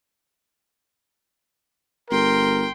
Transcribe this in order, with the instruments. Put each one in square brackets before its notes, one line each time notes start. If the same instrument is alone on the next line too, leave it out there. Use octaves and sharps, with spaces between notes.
[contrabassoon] G1 [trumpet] A#4 [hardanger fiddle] G5 C6